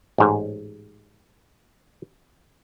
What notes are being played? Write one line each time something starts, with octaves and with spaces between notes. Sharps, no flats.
A1 G#2